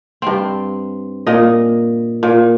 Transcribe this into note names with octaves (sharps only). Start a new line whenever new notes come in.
G2 C4
A#2 D#5
A#2